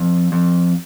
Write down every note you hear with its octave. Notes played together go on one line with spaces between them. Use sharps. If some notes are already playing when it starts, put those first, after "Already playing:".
Already playing: F2
F2